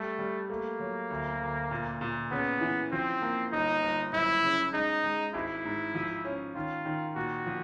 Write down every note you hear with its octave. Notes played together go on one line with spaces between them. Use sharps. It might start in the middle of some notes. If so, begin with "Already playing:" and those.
Already playing: G3 A3
G3
A3 A#3
F#3
D2
D2
A#2
A#2
C#3 B3
E3
F3 C4
A#3
G1 D#4
G1
F#1 E4
C#3
G#3 D#4
G#3
G#1 E4
G#2
F3
C#4
D#3 F4
D#3
A#2 F#4
F3